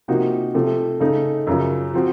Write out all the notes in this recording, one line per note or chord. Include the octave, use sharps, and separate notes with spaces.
C3 F3 A#3 D#4 F#4
C3 F3 A3
C#3 A3 D#4
F#2 C#3 F3
F3 C4 F#4